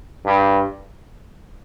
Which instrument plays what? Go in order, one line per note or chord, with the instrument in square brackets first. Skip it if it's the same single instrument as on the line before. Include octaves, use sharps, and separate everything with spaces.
[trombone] G2